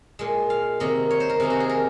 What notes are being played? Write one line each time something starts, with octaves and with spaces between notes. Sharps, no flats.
A#2 G#3
F5
C3 D#3 A#3 D#5
C#5
C5
A#4
C3 D#3 A#3 G#4
F#4
G#4
A#4